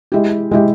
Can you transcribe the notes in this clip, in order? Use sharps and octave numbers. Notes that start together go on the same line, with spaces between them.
G#3 E4 G4
G#3 E4 G4